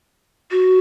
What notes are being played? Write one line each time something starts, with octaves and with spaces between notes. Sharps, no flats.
F#4